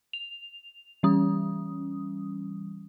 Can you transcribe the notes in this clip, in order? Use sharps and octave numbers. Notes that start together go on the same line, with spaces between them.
F7
E3 G3 C#4 D#6